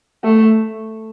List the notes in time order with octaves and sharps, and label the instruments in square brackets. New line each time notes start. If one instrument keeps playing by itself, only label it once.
[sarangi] A3